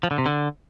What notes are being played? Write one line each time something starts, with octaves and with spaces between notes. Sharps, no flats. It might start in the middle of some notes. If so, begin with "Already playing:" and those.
F3
D3
C3
D3